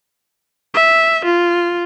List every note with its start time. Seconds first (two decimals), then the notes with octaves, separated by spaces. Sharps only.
0.74 E5
1.25 F4